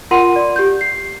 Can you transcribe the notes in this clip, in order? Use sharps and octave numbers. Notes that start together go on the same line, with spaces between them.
F4 A#4 F#5 C6 D#7
D5
G4 G6
C7